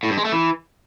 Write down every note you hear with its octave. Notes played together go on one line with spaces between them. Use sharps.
A2
G2
G#3
A3
E3